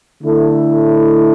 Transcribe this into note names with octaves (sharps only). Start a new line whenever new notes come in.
D3 A3 E4 A4